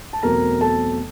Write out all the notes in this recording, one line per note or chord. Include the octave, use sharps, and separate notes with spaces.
A5
E2 B2 F#3 A3 C4 A#4 A#5
A4 A5